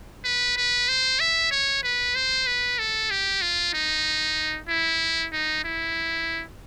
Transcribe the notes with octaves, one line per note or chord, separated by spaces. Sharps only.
B4
B4
C5
E5
C#5
B4
C5
B4
A4
G4
F4
D#4
E4
D#4
E4